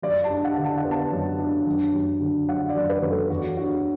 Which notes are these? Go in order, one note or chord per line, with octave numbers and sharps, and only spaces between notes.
F#2 D5
A5
D4
F#5
D3
A5
F#5
B3
A5
F#2
D4
F#2
F#2
D3
F#3 F#5
D5
F#2
B4
F#2
A4
E2 F#4
D4 F#4